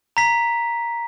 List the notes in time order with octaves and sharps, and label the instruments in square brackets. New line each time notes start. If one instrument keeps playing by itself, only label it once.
[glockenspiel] A#5 B6